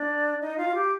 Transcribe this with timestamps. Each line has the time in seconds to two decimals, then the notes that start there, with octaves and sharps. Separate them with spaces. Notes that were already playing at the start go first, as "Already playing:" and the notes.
Already playing: D4 D5
0.41 D#4 D#5
0.57 F4 F5
0.69 F4
0.74 G4